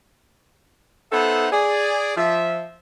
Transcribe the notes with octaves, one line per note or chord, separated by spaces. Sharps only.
B3 D#4 A4 C5 E5 F#5
G#4 D5
F3 E5